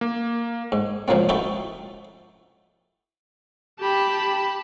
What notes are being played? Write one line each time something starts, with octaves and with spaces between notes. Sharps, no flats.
A#3
G#2
C#2 C#3 F3 F#3 A#3 C4
D#4 E4 F#4 G4 A4
G4 A5 B5